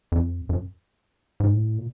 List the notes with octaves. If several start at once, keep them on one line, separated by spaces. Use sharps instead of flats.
F2
F#2
G#2
A2
A#2